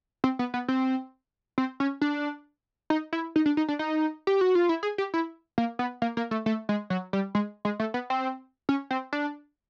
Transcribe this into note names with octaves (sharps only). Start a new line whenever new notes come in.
C4
B3
B3
C4
C4
C#4
D4
D#4
E4
D#4
D4
D#4
D4
D#4
G4
F#4
F4
E4
G#4
G4
E4
A#3
B3
A#3
A#3
A3
A3
G#3
F#3
G3
G#3
G#3
A3
B3
C4
C#4
C4
D4